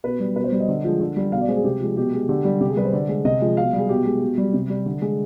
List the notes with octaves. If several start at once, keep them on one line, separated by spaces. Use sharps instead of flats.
B2 B4
G3
B2 B4
C5
G3
D#5
D3
F3 G#3
D3
G3
B2 F5
D5
G#3 C5
G#4
C3 G4
F3 G#3
B2 G4
G#3
D3 G4
G3
C3 G4
G#4
G3 B4
C5
D3 D5
G#3
C3 D#5
F3 G#3
B2 F5
G3
G#4
B2 G4
G#3
B2
G3
C3
G3
D3
G#3